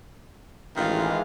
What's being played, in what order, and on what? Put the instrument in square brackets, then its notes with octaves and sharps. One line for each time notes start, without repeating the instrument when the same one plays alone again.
[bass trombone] A1 [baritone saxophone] D#3 [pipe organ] E3 G#3 [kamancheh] F4 F5